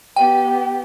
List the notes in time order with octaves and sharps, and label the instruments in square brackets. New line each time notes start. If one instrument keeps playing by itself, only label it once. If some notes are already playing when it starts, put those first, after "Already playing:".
[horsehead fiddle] B3 G4 [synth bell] G5